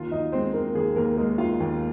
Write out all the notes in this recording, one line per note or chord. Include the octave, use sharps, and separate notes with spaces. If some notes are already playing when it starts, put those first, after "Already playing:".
Already playing: D#2 F4 F5
D#2 D#4 D#5
G#3 C4 C5
D#3 A#3 A#4
D#2 G#4
D#2 A#3 A#4
G#3 A#3 A#4
D#3 F4 F5
D#2